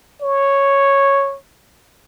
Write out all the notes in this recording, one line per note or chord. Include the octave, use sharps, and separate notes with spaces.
C#5